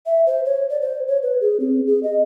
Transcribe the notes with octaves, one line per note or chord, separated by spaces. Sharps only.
E5
C5
C#5
D5
C5
C#5
B4
G#4
C4
G#4
D#5